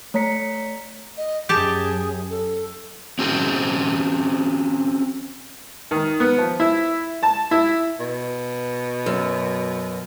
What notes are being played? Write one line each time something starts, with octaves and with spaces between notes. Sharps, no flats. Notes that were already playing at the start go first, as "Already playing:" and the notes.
A3 C#5 A#5 B6 C#7
D#5
F#2 G4 G#4 A5
A4
C4 C#4 F#4 G#4 C5
D#3
B3
F3
E4
A5
E4
B2
F#2